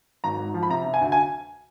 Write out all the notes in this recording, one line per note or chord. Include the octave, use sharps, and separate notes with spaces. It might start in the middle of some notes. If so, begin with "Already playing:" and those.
G#1 A#5
G#2
F3
B5
C3 A#5
C3
G#5
D2
G#5